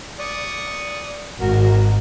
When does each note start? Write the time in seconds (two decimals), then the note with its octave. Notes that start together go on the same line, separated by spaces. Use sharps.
0.19 D5 C#6 D#6
1.40 G#1 F#4 A#4